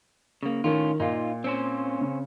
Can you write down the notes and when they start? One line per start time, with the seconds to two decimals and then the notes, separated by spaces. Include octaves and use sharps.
0.43 C#3 A#3
0.64 A2 D#3 C#4 F4
1.00 A#2 D#4 F4
1.44 C4 C#4 C5
2.01 C#3